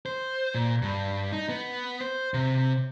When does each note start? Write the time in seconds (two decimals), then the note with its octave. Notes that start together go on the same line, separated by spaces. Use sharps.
0.06 C5
0.55 A#2
0.82 G2
1.32 D#4
1.49 B3
2.01 C5
2.34 C3